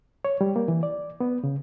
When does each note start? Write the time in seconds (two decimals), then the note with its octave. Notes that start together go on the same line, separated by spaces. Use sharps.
0.25 C#5
0.41 G3
0.56 A#3
0.68 E3
0.83 D5
1.20 B3
1.44 C#3